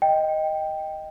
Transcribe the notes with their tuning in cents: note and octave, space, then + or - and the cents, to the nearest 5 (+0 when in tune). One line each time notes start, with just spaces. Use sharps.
D#5 +0 G5 +0